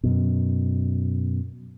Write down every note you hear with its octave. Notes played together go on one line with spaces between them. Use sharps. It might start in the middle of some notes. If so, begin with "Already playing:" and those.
F#2 B2